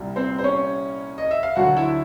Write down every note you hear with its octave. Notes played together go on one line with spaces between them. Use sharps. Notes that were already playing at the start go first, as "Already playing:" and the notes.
Already playing: C2 A#2 G3
C4 C5
C5
C#4 C#5
D#5
E5
F5
D2 D3 F#3 A3 F#4 F#5
E4 E5